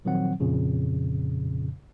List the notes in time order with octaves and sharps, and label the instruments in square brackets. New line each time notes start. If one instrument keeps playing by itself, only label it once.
[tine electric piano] A#2 D#3 F3 F#3 C4 F#5
F2 A#2 C#3 F3